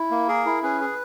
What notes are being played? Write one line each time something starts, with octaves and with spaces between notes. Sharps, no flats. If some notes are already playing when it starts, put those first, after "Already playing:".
Already playing: E4
A#3
G#4 A#4
E4
C#4 G#4 B4
G#4